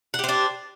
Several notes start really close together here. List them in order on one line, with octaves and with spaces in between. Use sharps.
F#5 G4 C5 D4